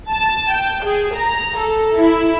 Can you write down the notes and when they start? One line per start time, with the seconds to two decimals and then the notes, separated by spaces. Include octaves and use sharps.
0.10 A5
0.52 G5
0.85 G#4
1.16 A#5
1.58 A4
1.96 E4